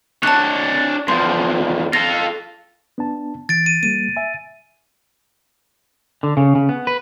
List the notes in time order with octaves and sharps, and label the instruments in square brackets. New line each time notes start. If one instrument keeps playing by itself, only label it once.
[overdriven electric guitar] D4 C#5 [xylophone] A5 F#6
[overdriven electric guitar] E2 F3 [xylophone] C6
[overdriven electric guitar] F4 A4 [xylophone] A#6
[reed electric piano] B3 D4 A5
[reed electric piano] E3 [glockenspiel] A6 D7
[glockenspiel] D#7
[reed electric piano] G3 A#3 [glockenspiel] D#7
[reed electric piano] E5 G#5
[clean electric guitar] D3
C#3
C#3
B3
B4